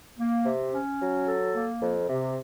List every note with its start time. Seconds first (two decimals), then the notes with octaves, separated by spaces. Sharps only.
0.18 A#3
0.45 C3
0.72 C#4
0.99 F#3
1.26 A4
1.53 A#3
1.80 F2
2.07 C3